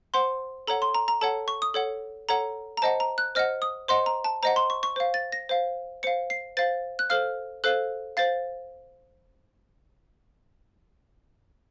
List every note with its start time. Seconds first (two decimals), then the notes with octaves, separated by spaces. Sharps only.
0.14 C5 F#5 C6
0.67 A4 C#5 F#5 A#5
0.82 C6
0.95 A#5
1.08 A#5
1.21 A4 C#5 F#5 A5
1.48 C#6
1.62 D#6
1.74 A4 C#5 F#5
2.29 A4 C#5 F#5 A#5
2.77 A#5
2.82 C5 D#5 F#5 A5
3.00 A#5
3.18 F#6
3.35 C5 D#5 F#5 F6
3.62 D#6
3.88 C5 D#5 F#5 C6
4.06 A#5
4.24 A5
4.43 C5 D#5 F#5 A#5
4.56 C6
4.70 C#6
4.83 C#6
4.96 C5 F5
5.14 A6
5.32 A#6
5.49 C5 F5
6.03 C5 F5 C#7
6.30 C7
6.57 C5 F5 A6
6.99 F#6
7.10 A4 C5 F5 F6
7.64 A4 C5 F5 F#6
8.17 C5 F5 A6